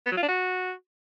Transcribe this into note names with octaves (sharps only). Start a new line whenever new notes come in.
B3
F#3
F4
D4
F#4